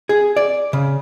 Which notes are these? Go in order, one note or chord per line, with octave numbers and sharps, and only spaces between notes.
G#4
D5
C#3